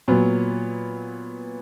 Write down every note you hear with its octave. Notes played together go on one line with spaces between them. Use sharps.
A#2 F#3 B3